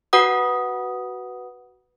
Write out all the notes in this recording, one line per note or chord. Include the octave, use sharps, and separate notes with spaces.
F#4 B4 F#5 D#6